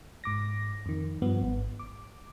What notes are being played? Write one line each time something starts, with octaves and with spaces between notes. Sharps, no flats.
G#2 D6 A#6
F2 D#3
G2 F3 B3
G#1
D6